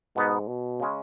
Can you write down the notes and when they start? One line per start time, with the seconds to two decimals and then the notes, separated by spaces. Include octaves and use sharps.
0.16 G#2 B2 B3 D#4
0.48 B2
0.80 C#3 G#3 C#4